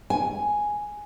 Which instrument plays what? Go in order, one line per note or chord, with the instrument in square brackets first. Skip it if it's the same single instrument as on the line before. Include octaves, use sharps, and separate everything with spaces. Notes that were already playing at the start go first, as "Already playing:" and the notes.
[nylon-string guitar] G#5